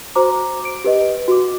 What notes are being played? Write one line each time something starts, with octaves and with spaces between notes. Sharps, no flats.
F#4 C5 A#5 D6
D7
G4 B4 D#5
F#4 D6